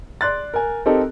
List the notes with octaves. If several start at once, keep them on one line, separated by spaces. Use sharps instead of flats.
D5 C6 F#6 A6
A#4 G#5
C4 D#4 G4 A4 A#4